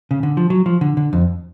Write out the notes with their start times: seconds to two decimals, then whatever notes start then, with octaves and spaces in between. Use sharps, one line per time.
0.11 C#3
0.23 D3
0.37 F3
0.50 F#3
0.66 F3
0.81 D3
0.97 D3
1.13 F2